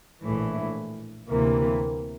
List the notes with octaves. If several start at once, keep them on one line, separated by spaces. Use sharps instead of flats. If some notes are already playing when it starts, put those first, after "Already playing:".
A#1 A2 E3
D2 C3 E3 A#3